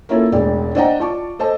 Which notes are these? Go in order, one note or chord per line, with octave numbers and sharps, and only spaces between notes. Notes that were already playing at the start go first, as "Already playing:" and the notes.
A#3 C#4 E4 F4 A4
E1 A1 G#3 D5
D4 C5 D#5 F#5 G5 A#5
F4 D5 A5 C#6 D6
A4 C5 D#5 A5